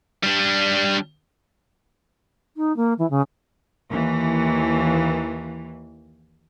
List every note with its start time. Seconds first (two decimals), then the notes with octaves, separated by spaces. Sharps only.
0.23 G3 D4
2.57 D#4
2.76 A#3
2.99 E3
3.10 C#3
3.90 D#2 E3